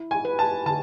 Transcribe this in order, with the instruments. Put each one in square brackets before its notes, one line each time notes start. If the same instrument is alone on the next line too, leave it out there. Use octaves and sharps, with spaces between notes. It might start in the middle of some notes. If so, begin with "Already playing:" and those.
Already playing: [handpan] E4
[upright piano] G#5
[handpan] B4
[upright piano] A5
[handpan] D3 [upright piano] A5